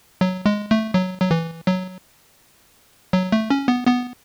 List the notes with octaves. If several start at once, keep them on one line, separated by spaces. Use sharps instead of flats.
F#3
G#3
A3
F#3
F#3
E3
F#3
F#3
A3
C#4
B3
B3